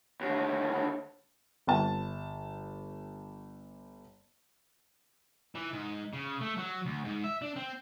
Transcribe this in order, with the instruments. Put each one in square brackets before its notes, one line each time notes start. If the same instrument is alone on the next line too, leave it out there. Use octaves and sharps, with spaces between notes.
[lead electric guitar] D#2 D3
[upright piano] G1 A5
[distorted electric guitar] E3
G#2
C#3
A3
F#3
D2
G#2
E5
D4
C4